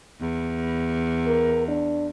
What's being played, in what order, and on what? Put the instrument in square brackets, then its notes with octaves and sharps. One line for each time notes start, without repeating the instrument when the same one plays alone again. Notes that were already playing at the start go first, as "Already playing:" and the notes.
[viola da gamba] E2
[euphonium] A#4
D4